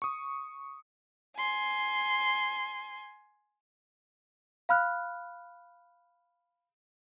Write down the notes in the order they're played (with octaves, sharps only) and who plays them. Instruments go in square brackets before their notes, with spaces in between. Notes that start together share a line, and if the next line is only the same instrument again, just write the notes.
[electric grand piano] C#6 D#6
[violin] G#5 C6
[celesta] F5 B5 F6 F#6